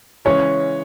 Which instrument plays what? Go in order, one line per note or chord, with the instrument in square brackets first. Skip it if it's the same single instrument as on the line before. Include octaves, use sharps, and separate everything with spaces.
[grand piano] C#3 E3 G#3 C#4 [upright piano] C#5